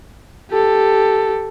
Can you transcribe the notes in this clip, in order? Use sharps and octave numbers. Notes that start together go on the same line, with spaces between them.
G4 A4